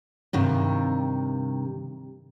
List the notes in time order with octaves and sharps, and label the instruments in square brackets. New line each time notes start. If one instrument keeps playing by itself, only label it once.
[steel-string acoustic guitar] G2 C3 D#3